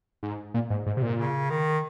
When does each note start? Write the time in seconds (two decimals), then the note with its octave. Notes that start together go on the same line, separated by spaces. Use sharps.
0.23 G#2
0.54 A#2
0.70 G#2
0.86 G#2
0.97 C3
1.02 A#2
1.18 C#3
1.50 D#3